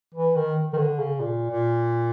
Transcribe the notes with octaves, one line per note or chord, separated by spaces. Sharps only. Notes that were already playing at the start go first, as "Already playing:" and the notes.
E3
D#3
D#3
D3
C#3
A#2
A#2